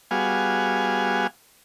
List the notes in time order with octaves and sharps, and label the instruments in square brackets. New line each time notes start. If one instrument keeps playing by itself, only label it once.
[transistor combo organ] G3 B3 F#4 G#4 F5 G#5